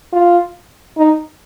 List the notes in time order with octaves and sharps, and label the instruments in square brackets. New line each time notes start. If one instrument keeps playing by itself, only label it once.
[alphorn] F4
D#4